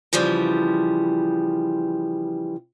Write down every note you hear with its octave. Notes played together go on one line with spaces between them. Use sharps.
C#3 E3 F3 G3